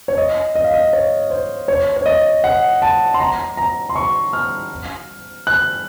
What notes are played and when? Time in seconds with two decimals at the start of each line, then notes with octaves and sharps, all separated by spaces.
0.08 C#5
0.18 D#5
0.55 D#5
0.64 F5
0.74 D#5
0.93 C#5
1.30 C5
1.68 C#5
1.97 C#5
2.06 D#5
2.44 F#5
2.82 A5
3.14 C6
3.20 A#5
3.57 A#5
3.89 C6
3.96 C#6
4.33 F6
5.47 F#6